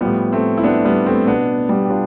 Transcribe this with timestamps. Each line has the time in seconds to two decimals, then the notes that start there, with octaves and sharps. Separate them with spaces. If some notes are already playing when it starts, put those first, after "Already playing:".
0.01 A2 F3 G3 B3
0.32 A3 C4
0.58 E4
0.64 B3 D4
0.85 G3 B3
1.06 A3 C4
1.27 B2 B3 D4
1.69 G3 B3
1.85 G4
1.90 D4 F4